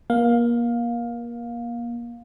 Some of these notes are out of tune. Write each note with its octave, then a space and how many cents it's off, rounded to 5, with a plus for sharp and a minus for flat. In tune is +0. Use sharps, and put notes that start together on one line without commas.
A#3 +30 F5 +15